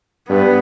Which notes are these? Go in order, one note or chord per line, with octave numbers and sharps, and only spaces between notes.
G2 B3